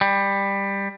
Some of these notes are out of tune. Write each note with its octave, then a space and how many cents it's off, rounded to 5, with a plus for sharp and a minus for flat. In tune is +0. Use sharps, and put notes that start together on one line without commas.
G3 +15